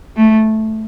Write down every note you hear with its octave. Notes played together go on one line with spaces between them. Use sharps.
A3